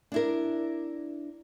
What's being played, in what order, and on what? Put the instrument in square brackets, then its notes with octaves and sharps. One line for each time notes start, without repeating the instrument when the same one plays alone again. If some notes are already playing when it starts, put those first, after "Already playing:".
[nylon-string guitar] D4 E4 A#4